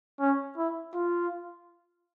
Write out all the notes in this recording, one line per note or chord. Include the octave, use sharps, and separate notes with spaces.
C#4
E4
F4